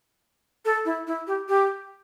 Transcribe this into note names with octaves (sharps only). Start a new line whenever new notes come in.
A4
E4
E4
G4
G4